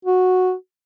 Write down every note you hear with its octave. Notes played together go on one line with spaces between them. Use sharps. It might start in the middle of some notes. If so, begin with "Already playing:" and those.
F#4